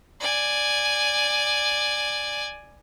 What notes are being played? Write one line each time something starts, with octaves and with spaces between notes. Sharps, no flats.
D5 G#5